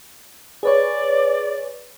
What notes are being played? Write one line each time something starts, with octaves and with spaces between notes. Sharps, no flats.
G#4 B4 C#5 D5